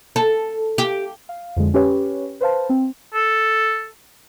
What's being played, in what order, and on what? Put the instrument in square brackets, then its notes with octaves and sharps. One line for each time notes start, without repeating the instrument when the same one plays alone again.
[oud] A4
G4
[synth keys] F5
F2 D3 G#3
C#4 G4 B4 C#5
B4 C5 F5 A5
C4
[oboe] A4